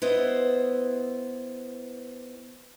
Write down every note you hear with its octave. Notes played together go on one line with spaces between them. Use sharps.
B3 E4 C5 D#5